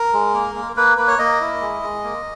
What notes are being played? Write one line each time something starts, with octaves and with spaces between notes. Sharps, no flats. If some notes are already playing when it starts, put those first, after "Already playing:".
Already playing: A#4
G#3
A#3
A#3
A#3 B4
A#3 B4
C#5
A#3 D#5
E4
G#3
G#3
A#3